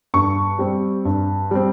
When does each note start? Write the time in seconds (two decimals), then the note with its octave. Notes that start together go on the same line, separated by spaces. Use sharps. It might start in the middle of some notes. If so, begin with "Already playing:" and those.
0.14 G2 C#6
0.59 G3 C4
1.05 G2
1.51 G3 C4